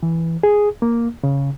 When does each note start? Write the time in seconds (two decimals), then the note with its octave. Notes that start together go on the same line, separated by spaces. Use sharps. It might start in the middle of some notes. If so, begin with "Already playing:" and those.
0.03 E3
0.43 G#4
0.82 A#3
1.24 C#3